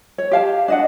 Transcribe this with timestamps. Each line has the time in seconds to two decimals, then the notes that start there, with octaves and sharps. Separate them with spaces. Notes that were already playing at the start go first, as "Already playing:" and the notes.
0.18 C#5
0.31 G4 F5 A5
0.68 D4 D#5 F#5